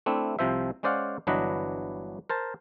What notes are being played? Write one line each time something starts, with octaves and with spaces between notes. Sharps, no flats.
A3 C4 D4 E4
C2 C3 F3 C5 E5
G#3 C#4 C5 D5 F5 F#5
G1 E3 F#3 D4 B4 D#5
A#4 C5 A5